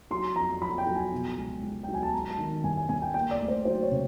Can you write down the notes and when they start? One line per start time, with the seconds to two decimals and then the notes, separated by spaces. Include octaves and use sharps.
0.11 F#3 C6
0.36 F2 A#5
0.62 F2 B5
0.78 G5
0.87 F#3
0.95 G#5
1.12 B2
1.37 C#2
1.63 C#2
1.83 G5
1.89 F#3
1.94 G#5
2.03 A5
2.13 G#3 A#5
2.30 A5
2.38 D#3
2.64 G2 G#5
2.77 G#5
2.89 G2 G#5
3.02 G5
3.14 A#3 G5
3.31 D5
3.40 D2
3.48 C5
3.65 F#3 C5
3.83 C#5
3.91 C#3